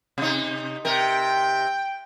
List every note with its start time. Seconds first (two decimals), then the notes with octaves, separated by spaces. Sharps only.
0.18 C3 D#4
0.85 C3 A#4 G5